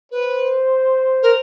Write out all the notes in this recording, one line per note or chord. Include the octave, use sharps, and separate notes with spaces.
B4 C5
A#4